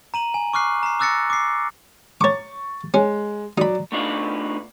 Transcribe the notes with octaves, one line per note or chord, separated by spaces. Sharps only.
A#5 D#7 F#7
G#5
C#6 D6 F6 F#6 C7
A#5 C7
D6 E6 F#6 A6 A#6 C#7
D6 C7
C#5 C#6 D6 A6
G#3 C#4
F#3 D#4 D5 B5
A3 B3 D4 D#4 F4 D5